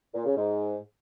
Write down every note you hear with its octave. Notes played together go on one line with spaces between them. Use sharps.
A#2
C#3
G#2